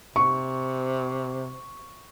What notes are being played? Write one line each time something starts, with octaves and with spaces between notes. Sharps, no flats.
C3 C#6